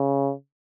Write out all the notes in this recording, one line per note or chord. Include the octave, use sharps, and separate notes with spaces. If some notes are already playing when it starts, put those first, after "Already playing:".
Already playing: C#3